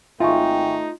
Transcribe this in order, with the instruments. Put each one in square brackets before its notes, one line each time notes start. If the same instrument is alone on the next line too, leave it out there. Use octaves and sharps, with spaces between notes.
[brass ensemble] G#1 G5 [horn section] A3 D#4 [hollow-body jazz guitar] F4 [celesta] E5 G#5 C#6